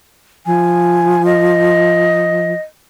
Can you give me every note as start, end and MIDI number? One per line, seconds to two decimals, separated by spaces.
0.46 2.53 53
0.46 1.25 80
1.26 2.60 75